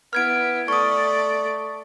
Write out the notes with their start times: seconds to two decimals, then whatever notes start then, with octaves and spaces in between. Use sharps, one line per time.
0.13 B3 E4 F6 G#6 D7
0.68 A3 D5 C#6 D#6